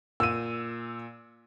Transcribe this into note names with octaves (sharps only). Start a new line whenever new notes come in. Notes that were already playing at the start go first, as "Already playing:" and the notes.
A#2 E6 D#7